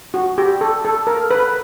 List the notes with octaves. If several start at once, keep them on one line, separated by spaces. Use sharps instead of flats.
F#4
G4
A4
A4
A#4
B4